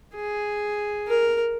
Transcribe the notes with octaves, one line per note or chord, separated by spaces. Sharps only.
G#4
A#4